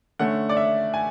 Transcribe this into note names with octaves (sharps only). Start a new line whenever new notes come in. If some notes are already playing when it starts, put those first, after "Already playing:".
D3 A3 C#4 F#5
D5
E5
G#5